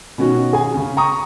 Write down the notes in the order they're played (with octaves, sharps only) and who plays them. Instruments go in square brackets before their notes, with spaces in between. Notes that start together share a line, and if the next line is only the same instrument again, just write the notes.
[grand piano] B2 D#3 C#4 F#4
G#4 G#5
C#3 C#4
G5 A#5 C#6 D#6